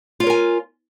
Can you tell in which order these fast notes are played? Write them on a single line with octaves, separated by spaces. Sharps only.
F4 C#5 A#4 G#5